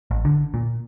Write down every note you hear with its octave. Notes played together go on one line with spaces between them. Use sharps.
A1
D3
A#2